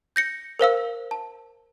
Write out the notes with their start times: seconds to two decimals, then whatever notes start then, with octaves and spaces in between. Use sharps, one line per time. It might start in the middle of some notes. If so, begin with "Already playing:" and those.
0.16 G6 A#6 C#7
0.59 A#4 C5 F5 E6
1.11 A5